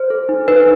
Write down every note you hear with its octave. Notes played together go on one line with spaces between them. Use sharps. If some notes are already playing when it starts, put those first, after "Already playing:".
Already playing: C5
A4
D#4
D#4 B4